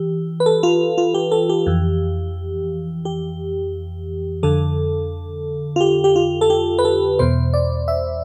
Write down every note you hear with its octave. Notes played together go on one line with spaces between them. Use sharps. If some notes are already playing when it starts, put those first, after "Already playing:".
Already playing: E3 G4
B4
A4
F4
F4
G4
A4
G4
F2 E3
G4
F2 D3 A4
F4
G4
G4
F4
A4
G4
B4
A4
E2 B2 C5
D5
E5